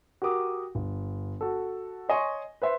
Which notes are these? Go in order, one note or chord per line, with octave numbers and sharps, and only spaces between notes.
F#4 G4 A#4 D6 D#6
G1
F#4 A4
C#5 D#5 G#5 C6 C#6
B4 C5 E5 C6